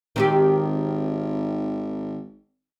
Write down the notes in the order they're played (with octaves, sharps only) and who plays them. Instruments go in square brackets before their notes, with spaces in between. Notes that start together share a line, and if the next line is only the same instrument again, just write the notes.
[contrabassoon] G#1 [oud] D#3 C4 G4